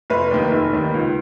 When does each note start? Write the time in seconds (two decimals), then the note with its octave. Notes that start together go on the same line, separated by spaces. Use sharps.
0.10 F1 B4
0.31 D#2 D#3
0.51 F1
0.73 D#2 D#3
0.94 C#2